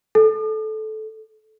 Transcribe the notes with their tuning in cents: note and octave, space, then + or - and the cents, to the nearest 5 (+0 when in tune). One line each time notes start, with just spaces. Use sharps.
A4 -15